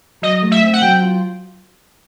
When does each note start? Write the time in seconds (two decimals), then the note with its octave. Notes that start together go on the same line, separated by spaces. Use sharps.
0.22 F#3 D#5
0.42 A3
0.52 E5
0.62 C4
0.73 F#5
0.82 F#3 G5
1.02 F4